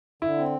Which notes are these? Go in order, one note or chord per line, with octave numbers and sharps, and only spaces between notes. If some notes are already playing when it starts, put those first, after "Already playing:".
D3 E4
C4